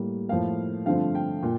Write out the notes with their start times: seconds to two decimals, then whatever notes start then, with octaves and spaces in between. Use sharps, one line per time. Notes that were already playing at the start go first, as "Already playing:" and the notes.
Already playing: A2 G3 A#3
0.29 A2 F3 A#3 F5
0.86 G2 D3 F3 A3 C4 F5
1.15 G5
1.43 A#2